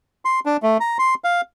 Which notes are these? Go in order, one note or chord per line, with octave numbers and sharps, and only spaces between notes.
C6
D4
A3
A#5
C6
F5